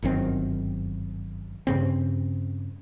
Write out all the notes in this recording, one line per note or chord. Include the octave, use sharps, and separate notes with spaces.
G1 F#2 D#3 C4
G2 C#3 C4